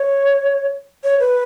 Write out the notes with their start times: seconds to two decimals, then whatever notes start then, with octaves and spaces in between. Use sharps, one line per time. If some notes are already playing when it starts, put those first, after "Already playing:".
Already playing: C#5
1.04 C#5
1.20 B4